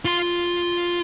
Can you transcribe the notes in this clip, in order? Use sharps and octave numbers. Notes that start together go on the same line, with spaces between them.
F4 C6